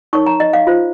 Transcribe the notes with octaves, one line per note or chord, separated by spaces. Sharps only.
D#4 A#4 C#5 C#6
A#5
D#5
F5
F4 C5